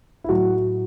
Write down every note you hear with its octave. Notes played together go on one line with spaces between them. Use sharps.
E4
A2 F#3 F#4